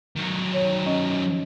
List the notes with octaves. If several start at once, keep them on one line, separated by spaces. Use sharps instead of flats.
D#3 F#3
C#5
C#4 D#5